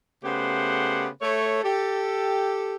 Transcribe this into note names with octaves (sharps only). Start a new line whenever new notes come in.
C#3 A3 B3 G4 C5 F#5
A3 C#5
G4 A4